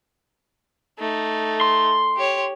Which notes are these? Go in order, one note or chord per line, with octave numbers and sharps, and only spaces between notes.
A3 D#4
C6
G4 C#5